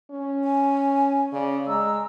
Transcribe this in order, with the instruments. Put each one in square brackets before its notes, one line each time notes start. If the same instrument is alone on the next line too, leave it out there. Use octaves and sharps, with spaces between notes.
[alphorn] C#4
[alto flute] G#5
[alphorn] C#3 [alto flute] D5
[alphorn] G#3 [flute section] A#5 E6